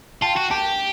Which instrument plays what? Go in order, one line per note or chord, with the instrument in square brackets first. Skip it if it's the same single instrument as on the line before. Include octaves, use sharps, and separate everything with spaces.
[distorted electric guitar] F4 [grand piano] G5 A5
[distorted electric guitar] F#4
[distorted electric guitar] G4 [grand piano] G5 A5